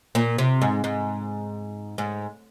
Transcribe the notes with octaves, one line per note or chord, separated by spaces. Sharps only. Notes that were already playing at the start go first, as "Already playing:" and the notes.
A#2
C3
G#2
G#2
G#2